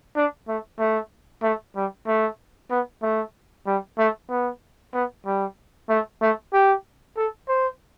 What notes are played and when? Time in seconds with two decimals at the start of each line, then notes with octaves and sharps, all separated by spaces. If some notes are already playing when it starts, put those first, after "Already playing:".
0.16 D4
0.48 A3
0.79 A3
1.43 A3
1.75 G3
2.07 A3
2.70 B3
3.02 A3
3.67 G3
3.98 A3
4.30 B3
4.94 B3
5.26 G3
5.89 A3
6.22 A3
6.53 G4
7.17 A4
7.48 C5